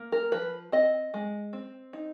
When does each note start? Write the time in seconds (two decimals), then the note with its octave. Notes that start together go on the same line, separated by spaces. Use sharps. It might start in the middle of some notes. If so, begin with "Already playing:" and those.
Already playing: A#3
0.12 A#4
0.32 F3 B4
0.72 C4 D#5
1.14 G#3
1.53 C4
1.93 D#4